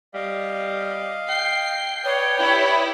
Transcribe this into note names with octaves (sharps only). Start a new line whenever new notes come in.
G3 D#5 F5
G5 C7
B4 C#5 D5 D#6
E4 G4